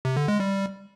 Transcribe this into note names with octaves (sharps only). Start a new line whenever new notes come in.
C3
D3
G#3
G3